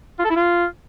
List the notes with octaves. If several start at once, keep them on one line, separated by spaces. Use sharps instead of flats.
F4
A4
E4
F4